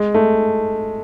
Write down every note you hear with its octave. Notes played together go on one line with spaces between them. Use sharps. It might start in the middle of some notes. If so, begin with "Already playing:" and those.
Already playing: G#3
A3